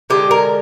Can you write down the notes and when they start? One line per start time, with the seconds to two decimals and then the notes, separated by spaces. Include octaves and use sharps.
0.10 D3 G#3 G4
0.31 A#4